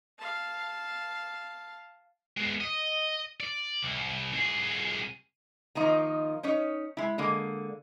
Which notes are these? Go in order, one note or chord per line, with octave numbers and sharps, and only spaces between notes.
F5 A5
G#3 B3
D#5
D5
C2
C2 G#4
D#3 F3 A#3 D#4 F4
C#4 D#4 C#5
G#3 E4
D3 G#3 A#3